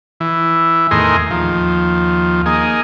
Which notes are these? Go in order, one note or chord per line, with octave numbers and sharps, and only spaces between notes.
E3
E2 A2 D#3 G#4 A#4 C6
D#2 F3
A#3 D#4 G#4